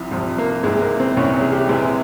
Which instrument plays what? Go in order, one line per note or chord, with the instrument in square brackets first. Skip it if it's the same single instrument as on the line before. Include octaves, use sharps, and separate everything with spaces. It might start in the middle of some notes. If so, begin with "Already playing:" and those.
Already playing: [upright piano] C2 C3 F3 [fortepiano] E4
[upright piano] C2 C3 F3
[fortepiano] A#3
[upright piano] C2 C3 E3 [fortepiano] G#3
[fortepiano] A#3
C4
[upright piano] C2 C3 E3 [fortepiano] C#4
[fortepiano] G#4
G4
[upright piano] C3 E3 G#3 E4 [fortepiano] G#4